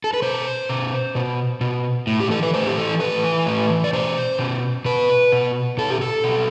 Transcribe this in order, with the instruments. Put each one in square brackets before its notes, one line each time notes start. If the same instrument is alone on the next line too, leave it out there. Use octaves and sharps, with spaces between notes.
[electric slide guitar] A4
B4
B2 C5
B2
B2
B2
A2
G4
E3 A4
B4
A2 C5
G4
E3 A4
A2 B4
E3
A2
E3
D5
B2 C5
B2
B2 B4
B2
B2 A4
G4
A4
B2